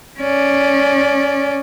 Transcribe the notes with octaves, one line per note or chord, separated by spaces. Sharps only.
C#4 D5